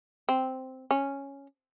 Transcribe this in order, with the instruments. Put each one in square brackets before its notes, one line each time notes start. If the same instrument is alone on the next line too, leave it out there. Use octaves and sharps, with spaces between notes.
[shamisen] C4
C#4